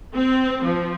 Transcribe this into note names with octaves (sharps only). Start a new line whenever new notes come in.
C4
F3